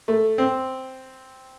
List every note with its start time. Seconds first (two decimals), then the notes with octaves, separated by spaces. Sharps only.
0.08 A3
0.38 C4